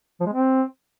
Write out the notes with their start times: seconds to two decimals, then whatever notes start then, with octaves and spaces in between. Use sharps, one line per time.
0.20 F3
0.26 G#3
0.33 C4